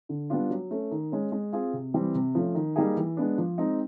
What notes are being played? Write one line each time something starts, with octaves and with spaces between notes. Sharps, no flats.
D3
G3 B3 D4 F4
F#3
A3 C#4
D#3
G#3 C#4
G#3
C4 F4 G#4
C3
E3 G3 C4
C3
F3 A3 C#4
D#3
G3 A#3 D#4 G#4
E3
G#3 B3 D4
F3
G#3 C4 D#4